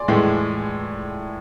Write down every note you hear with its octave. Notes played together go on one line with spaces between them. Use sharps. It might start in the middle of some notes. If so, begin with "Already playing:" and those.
Already playing: D5 G#5 C6 D6
A2 E3 G#3